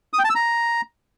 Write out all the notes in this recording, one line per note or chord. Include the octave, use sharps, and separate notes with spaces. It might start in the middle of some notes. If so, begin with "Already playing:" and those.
D#6
G5
A5
E6
A#5